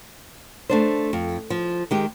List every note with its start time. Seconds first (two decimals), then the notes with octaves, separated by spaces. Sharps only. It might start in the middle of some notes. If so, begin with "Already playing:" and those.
0.69 A3 D4 C5
1.13 F2
1.50 F3
1.91 D#3 G#3 G4